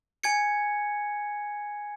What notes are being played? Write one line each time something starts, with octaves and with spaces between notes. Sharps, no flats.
G#5 G#6 C#7